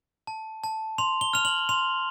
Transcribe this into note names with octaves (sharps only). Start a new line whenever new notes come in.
A5
A5
C6 F7
G7
F6 F7
F#7
C6 F7